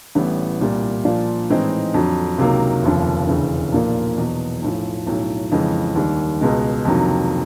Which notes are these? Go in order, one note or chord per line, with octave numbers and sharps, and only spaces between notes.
A1 A2 E3 G3 B3
C2 A#2 G3
A#2 F3 A#3 D4 F4
A2 E3 G#3 C4 D#4
F2 D3 F#3
C#2 C3 D#3 F#3 A#3
F1 D#2 C#3 F3
E1 D2 C#3 E3
B1 A#2 F3 A#3 D4
E2 B2 F#3
B1 A2 F3
B1 A2 F#3
F2 C#3 E3 G#3
D#2 D#3 G3
C#2 B2 G#3
F2 C3 D#3 F#3 A#3